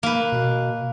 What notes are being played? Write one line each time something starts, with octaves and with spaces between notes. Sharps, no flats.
A#3 B4
B2